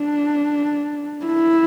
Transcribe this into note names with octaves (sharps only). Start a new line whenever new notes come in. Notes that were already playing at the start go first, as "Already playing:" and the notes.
Already playing: D4
E4